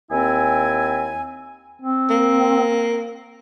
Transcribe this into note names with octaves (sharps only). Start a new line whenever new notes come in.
D#2 C4 E4 G#5
C4
A#3